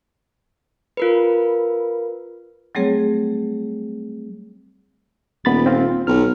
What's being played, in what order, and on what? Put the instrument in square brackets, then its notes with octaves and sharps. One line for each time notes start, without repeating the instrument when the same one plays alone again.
[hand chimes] F4 A#4 B4
[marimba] F#3 G3 A3 C4 G#4 C#5
[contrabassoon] D#1 [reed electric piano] B3 B5 A6
[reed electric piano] C4 F4
[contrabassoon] B1 [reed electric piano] F6